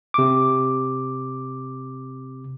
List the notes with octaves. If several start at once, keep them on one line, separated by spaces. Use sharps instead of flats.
C3 D6